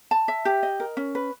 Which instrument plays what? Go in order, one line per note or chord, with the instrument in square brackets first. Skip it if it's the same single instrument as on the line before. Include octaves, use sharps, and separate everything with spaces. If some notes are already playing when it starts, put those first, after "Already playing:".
[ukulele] A5
E5
G4
D#5
A#4
C#4
B4